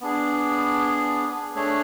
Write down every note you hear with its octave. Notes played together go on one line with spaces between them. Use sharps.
B3 D4 G#4
A3 D4 G#4 C#5